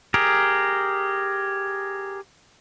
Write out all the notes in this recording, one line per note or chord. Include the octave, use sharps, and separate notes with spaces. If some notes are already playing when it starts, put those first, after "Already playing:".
G4 G#4 A#4